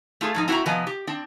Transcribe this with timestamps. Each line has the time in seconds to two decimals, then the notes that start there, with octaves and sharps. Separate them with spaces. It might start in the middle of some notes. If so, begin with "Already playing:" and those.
0.21 A3 F4 G#4 A4
0.34 G#2 F3 D#4
0.48 C4 E4 F#4 B4 E5 A#5
0.66 C3 F3 B3 B4 D#5 G#5
0.87 G4
1.07 C4 D4